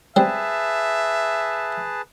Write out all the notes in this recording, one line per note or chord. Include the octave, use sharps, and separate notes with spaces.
G3 C4 G#4 B4 E5 A5